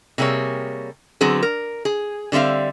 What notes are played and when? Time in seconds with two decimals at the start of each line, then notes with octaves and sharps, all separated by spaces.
0.18 C3 G3 A#3 G#4 C#5
1.21 D3 F#3 B3 C4 G#4
1.42 A#4
1.85 G#4
2.32 D3 G3 C4 E5 F5